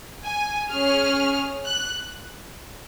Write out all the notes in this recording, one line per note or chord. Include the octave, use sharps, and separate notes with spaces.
G#5
C#4 G#4 F6
F#6